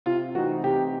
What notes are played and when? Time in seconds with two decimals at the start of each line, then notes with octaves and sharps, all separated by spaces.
0.06 C3 F4
0.35 E3 A3 C4 D#4 F#4
0.64 C3 G4